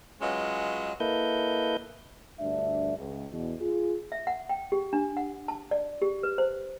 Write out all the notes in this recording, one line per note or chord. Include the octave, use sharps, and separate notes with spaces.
F#3 G#3 C#4 F4 B4 D#5
A#3 E4 A4 B4 D#5 G6
D2 G2 D4 E5
C#2
E2 B2
F4 G#4
E5
F#5
G5
G4
D4
F#5
A5
D5
G4
B4
C5